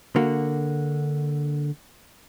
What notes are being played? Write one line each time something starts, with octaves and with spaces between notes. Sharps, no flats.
D3 A#3 F#4